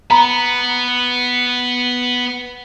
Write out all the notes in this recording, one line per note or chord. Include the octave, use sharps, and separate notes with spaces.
B3 A#5 B5